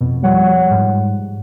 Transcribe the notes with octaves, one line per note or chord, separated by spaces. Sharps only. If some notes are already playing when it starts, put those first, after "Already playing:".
F2 B2
F3 G3 C#5 F#5
G#2